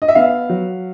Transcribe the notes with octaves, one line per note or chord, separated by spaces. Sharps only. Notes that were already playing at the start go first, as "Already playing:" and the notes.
D#5
E5
B3 F5
F#3